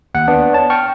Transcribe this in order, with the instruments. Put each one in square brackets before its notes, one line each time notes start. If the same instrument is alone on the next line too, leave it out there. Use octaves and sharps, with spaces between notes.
[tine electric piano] D#2 F#5
B3 D4
C#5 A5
G5 C#6 F6